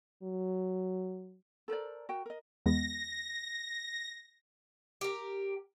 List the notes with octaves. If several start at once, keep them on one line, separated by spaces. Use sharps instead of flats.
F#3
A4 A#4 C5 D5
F#4 A#4 G5
A#4 D#5
E2 G#3 B3 A#6
G4 A#4